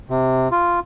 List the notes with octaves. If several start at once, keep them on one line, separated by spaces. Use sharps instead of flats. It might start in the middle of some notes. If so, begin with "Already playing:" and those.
C3
F4